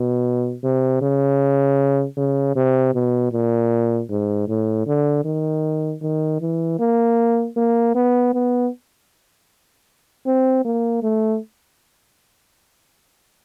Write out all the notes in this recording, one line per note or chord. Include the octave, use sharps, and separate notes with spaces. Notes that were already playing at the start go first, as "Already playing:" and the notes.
Already playing: B2
C3
C#3
C#3
C3
B2
A#2
G#2
A2
D3
D#3
D#3
E3
A#3
A#3
B3
B3
C4
A#3
A3